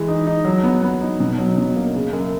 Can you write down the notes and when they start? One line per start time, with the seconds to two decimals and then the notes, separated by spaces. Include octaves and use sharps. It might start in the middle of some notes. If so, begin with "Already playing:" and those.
Already playing: E3 G#3
0.08 D#4
0.27 D#4
0.45 F#3
0.63 B3
0.83 B3
1.01 D#4
1.20 B2
1.38 F#3
1.58 B2
1.76 A#3
1.95 C#3
2.13 F#2